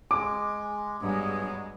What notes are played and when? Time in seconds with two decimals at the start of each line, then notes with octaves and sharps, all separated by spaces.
0.11 G#3 D6
1.01 G2 F#3 G#3 B3 G#4